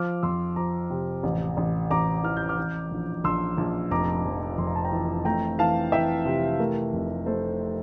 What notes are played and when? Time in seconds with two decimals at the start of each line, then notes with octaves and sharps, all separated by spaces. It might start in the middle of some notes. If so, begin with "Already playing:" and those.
Already playing: F3 D6 F6
0.23 F2 C6 E6
0.56 F3 A#5 D6
0.90 C3
1.23 A1
1.57 A1
1.90 A1 A#5 D6
2.23 E3 F6
2.37 G6
2.49 D6 F6
2.58 E3
2.91 A#1
3.24 A#1 C6 E6
3.58 A#1
3.91 F1 A#5 D6
4.26 F2
4.58 F2 C6
4.67 A#5
4.75 A5
4.84 G5 A#5
4.92 E3
5.25 A3 G5 A#5
5.58 E3 F5 A5
5.92 E3 E5 G5
6.26 C3
6.59 A3 A#4
6.93 F1
7.26 A3 A4 C5